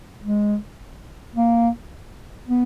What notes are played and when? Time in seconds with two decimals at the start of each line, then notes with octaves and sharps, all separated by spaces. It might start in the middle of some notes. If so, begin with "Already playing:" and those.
0.23 G#3
1.36 A#3
2.48 B3